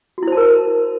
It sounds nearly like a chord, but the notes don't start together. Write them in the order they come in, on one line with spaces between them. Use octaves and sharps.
F#4 E4 C5 A5 A#4